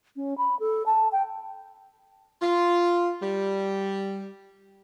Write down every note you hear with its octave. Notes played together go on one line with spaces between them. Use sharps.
C#4
B5
A4
A5
G5
F4
G3